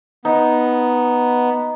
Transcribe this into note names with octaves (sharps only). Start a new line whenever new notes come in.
B3 D#4